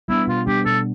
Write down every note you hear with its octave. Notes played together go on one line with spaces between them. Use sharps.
G3 B3 D4 E4
B2 F4
G3 B3 D4 G4
B2 A4